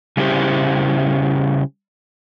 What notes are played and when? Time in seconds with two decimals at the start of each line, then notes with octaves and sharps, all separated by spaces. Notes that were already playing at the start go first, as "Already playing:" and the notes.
0.17 C#3 G3 C#4 E4 G4 C5